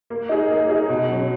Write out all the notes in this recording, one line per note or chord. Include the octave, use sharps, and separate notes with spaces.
A#3
D#4 G#4
A#3
D#4 G#4
B2
F#3 C#4